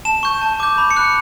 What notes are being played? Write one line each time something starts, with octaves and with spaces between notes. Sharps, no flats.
A5 E7
C#6 G6
A5
D6 G6
B5
C#7
F#6